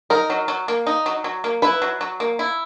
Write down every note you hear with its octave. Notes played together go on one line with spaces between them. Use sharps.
D#4 A#4
F#3
F#3
A#3
D#4
F#3
F#3
A#3
E4 B4
F#3
F#3
A#3
E4